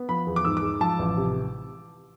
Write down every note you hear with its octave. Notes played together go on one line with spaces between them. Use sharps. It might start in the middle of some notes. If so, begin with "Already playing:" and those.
Already playing: B3
F3 B5
E2
D6
G#2 E6
D6
G#3
F3 A5
A1
C3